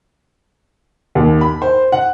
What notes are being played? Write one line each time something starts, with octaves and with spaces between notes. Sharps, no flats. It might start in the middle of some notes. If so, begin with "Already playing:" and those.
D#2
B5
C5
F#5